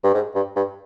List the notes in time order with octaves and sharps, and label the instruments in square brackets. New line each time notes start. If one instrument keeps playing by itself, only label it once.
[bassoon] G2
G#2
G2
G2